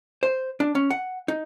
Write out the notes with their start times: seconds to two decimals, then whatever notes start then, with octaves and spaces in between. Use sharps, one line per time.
0.23 C5
0.60 D4
0.75 C#4
0.90 F#5
1.28 D#4